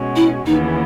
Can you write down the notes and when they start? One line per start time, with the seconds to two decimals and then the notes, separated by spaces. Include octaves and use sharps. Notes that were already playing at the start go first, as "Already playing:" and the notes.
Already playing: B2 G#3 C#4 F#4
0.16 E4
0.46 D#2 C#3 E3 B3 D#4